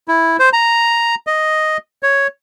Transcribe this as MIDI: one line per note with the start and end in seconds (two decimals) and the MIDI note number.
0.08 0.36 64
0.39 0.49 72
0.53 1.15 82
1.27 1.77 75
2.03 2.27 73